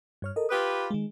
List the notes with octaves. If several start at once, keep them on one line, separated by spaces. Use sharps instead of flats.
G2 C#5 F6
A4 A#4 D#5
F4 G4 B4 D#6
D#3 G#3